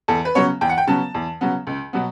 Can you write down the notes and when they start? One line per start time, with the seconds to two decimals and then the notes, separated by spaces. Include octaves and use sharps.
0.08 E2 A4
0.25 B4
0.35 C#3 F#3 B3 C#5
0.61 E2 G5
0.69 F#5
0.78 G5
0.87 C#3 F#3 B3 A5
1.14 E2
1.41 C#3 F#3 B3
1.67 C#2
1.93 B2 F#3 B3